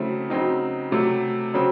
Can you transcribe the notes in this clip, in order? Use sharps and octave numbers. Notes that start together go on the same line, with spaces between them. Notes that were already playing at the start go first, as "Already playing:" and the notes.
Already playing: C#3 F#3 A3 C4 E4
C#3 F#3 C4 D#4
C3 F#3 A3
C#3 F#3 C4